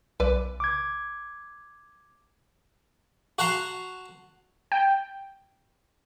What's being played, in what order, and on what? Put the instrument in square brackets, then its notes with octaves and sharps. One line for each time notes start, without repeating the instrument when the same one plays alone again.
[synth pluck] B1 [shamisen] B4 D5
[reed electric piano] D6 G#6
[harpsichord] F#4 F#5 A5 A#5 C6
[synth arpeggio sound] G5